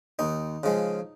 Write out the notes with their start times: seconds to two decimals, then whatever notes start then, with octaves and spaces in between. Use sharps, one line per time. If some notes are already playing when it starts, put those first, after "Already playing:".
0.19 D#2 D#4
0.63 C#3 F3 G#3